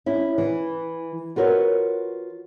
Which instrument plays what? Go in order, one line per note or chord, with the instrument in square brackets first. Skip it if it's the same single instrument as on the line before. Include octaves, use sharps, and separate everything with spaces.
[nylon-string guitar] C#4 E4
E3
F4 F#4 A#4 B4 C#5